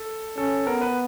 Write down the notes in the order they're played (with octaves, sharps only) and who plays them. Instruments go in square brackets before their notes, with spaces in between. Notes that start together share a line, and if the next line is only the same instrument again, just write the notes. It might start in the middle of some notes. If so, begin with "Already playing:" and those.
Already playing: [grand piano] A4
[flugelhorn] C#4 [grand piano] A4
[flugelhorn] B3 [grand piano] A#4
[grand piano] B4